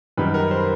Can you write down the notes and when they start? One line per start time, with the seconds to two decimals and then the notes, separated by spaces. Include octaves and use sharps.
0.18 F#2 D#3 G3 B4
0.34 A#4
0.51 C5